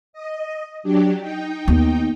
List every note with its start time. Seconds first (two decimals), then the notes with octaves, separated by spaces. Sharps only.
0.13 D#5
0.83 F#3 D4 G4
1.19 D#4 G5
1.68 D#2 B3